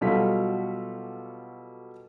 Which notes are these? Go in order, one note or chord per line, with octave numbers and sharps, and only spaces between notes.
B2 F#3 G3 F4 A4 B6